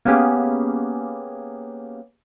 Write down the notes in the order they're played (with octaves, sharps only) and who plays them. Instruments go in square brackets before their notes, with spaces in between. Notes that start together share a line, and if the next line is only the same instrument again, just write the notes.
[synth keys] A#3 B3 C#4 G4 G#4